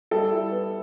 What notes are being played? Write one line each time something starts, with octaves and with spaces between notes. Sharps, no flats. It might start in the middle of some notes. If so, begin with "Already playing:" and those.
G3 A4
E4
B3